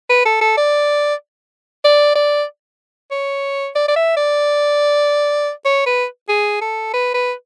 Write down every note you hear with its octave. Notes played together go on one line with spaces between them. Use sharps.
B4
A4
A4
D5
D5
D5
C#5
D5
D5
E5
D5
C#5
B4
G#4
A4
B4
B4